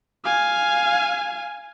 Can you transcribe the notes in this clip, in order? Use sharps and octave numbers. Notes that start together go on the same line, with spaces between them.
F5 G#5